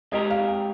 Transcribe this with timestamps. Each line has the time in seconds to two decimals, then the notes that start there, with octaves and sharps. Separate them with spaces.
0.12 G#3 C4 G4 A#4 D#5
0.30 F5
0.48 G5